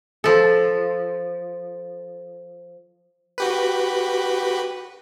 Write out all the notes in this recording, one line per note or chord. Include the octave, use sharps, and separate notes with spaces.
F3 A4
F#4 G4 B4